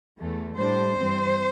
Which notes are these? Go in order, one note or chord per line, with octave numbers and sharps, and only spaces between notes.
E2 E3 A3
A2 G3 D4 C5
G2 E3 C4